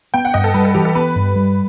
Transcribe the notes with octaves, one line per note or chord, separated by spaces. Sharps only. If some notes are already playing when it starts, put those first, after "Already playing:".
B3 G5
F#5
G2 D#5
A4
G3 B4
A4
E3 G4
A4
B3 B4
G2
G3